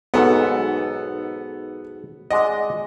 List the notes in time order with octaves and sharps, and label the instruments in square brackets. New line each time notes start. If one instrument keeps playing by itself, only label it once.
[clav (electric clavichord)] B1 G#2 [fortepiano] B3 A4
[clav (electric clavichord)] G#3 D5 F#5 [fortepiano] D#5